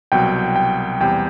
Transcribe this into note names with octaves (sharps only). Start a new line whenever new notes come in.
C2 B2 F#3 G5
G5
E2 C3 G3 G5